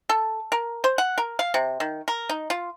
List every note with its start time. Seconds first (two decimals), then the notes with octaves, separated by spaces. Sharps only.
0.09 A4
0.52 A#4
0.84 C5
0.98 F#5
1.18 A#4
1.39 F5
1.54 C3
1.80 D#3
2.08 A#4
2.29 D#4
2.50 F4